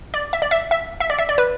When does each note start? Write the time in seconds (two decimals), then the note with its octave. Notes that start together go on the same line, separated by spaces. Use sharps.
0.14 D5
0.33 E5
0.42 D5
0.51 E5
0.71 E5
1.00 E5
1.10 D5
1.19 E5
1.29 D5
1.38 B4